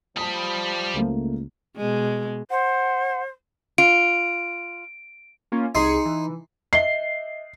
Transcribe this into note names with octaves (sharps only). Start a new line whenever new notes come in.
F3 G3 A5 B5 D#6
C#2 A3 A#3
B2 G#3
C5 F#5
F4 D7
A#3 C#4 F4
C2 D#4 G#4 C6 C#7
E3
D#5 E5 C7 G7